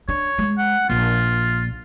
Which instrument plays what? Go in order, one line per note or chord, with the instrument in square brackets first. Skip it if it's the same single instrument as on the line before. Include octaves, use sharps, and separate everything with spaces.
[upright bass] D4 [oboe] C#5
[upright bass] G#3
[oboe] F#5
[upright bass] A#1 [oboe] F4